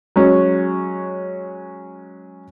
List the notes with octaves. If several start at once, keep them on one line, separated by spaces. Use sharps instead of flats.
F#3 G#3 C#4